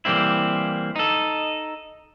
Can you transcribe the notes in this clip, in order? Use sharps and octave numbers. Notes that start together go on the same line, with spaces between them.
E3 G3 A#3 C4 E4
D#4 A4